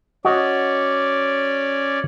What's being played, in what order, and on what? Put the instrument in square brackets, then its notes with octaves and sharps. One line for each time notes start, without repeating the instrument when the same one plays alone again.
[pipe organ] C#4 D5 [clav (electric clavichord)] F#4 D#5 F#5